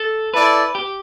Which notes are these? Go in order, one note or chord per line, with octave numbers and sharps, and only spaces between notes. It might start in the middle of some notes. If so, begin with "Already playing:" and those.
Already playing: A4
E4 A4 B4 D5
G4